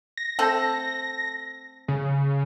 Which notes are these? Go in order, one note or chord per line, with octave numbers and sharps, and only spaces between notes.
A#6
A3 C4 A4
C#3